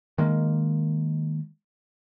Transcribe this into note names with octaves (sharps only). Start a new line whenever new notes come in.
D#3 G#3 A#3